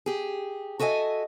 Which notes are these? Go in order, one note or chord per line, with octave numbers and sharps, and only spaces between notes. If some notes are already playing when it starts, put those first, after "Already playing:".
G4 G#4
F#4 A4 D#5 E5 G#5